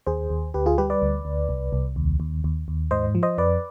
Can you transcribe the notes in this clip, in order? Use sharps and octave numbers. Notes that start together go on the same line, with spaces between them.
D#2 G#4 C5
D#2
D2 G4 B4
F4 G#4
G3 G4 B4
B4 D5
D2
D2
C2
C2
D#2
D#2
D#2
D#2
G#2 C5 D#5
F3
C5 D#5
F2 B4 D5